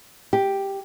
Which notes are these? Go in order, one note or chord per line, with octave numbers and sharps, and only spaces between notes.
G4